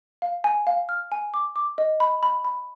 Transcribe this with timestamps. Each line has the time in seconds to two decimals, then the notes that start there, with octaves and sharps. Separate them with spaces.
0.22 F5
0.44 G#5
0.67 F5
0.89 F6
1.12 G#5
1.34 D6
1.56 D6
1.78 D#5
2.00 B5
2.23 B5
2.44 B5